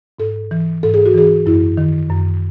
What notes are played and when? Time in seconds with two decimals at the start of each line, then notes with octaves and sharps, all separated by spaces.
0.19 G#2 A4
0.51 E3
0.83 G#2 A4
0.94 G#4
1.06 F#4
1.14 E3 G#4
1.46 F#2 E4
1.77 D#3
2.10 F#2